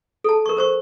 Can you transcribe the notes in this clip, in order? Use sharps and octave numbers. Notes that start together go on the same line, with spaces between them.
A4 A5
A#4 C#6
A#4 C5 C#6